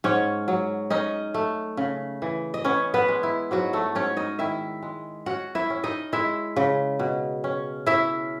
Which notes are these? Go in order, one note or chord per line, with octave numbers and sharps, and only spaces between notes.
G#2 C#4 C#5
F#3
C#4 D#4 D#5
A3
C#3
E3
D#5
B3 C#4 C#5
B3 B4
G#3
E4
G#2 F#3 F#4
A3 A4
G#2 C#4 C#5
D#4 D#5
D#3 E4 E5
G#3
C#4 F#4 F#5
E4 E5
C#4
D#4 D#5
G#3 E4 E5
C#3
B2
C#4
C#4 E4 E5